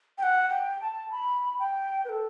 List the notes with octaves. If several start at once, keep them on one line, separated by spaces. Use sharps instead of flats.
G5
F#5
G5
A5
B5
G5
B4
A4